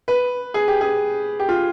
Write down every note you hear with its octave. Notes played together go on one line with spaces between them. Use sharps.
B4
G#4
G4
G#4
G4
F4